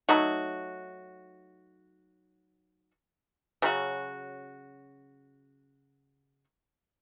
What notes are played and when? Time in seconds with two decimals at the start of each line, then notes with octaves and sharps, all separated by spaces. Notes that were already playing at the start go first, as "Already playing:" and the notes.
0.09 F#3 A3 D#4 F#4
3.62 C#3 F#3 C#4 F#4